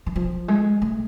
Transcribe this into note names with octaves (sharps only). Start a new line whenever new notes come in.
E3
F3
G#3
A3